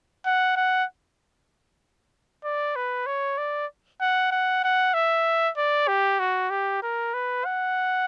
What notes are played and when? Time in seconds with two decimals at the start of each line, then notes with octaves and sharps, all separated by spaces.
0.26 F#5
0.57 F#5
2.44 D5
2.76 B4
3.07 C#5
3.38 D5
4.01 F#5
4.32 F#5
4.64 F#5
4.94 E5
5.57 D5
5.88 G4
6.19 F#4
6.50 G4
6.83 A#4
7.14 B4
7.45 F#5